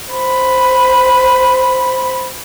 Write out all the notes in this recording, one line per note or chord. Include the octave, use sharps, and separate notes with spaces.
C5 B5